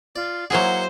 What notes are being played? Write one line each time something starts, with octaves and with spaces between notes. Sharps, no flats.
F4 D5
F#3 A#3 E4 F#4 G#4 C5 F#5